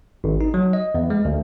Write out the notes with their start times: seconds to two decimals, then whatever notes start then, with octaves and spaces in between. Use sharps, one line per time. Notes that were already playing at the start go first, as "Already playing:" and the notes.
0.24 G#1
0.41 D#4
0.54 F#3
0.73 D#5
0.95 E2
1.10 G#3
1.25 D2